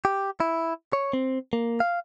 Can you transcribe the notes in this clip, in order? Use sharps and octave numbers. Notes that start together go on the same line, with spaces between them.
G4
E4
C#5
C4
A#3
F5